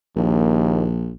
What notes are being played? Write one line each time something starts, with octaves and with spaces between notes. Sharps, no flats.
A#1 D#2